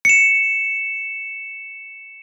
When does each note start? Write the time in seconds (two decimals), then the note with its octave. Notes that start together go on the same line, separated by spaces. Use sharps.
0.05 C#7 E7